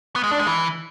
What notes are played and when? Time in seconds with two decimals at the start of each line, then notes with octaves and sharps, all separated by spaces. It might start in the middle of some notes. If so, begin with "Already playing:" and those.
0.16 B3
0.24 G#3
0.31 D4
0.39 G#3
0.47 E3